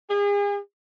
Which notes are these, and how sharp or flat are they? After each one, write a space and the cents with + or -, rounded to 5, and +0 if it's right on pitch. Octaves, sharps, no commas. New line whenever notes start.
G#4 -40